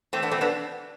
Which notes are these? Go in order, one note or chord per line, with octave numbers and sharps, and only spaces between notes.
E2 A3 C4
B3 D4
B2 A3 C4
B3 D4